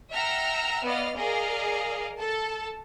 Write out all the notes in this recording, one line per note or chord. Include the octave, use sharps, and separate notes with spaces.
E5 F#5 G5 A#5 E6 F6
B3 D5 D#5 F5 F6
G#4 A#4 D5 D#5 F5
A4 A5